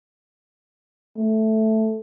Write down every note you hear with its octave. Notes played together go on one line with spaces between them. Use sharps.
A3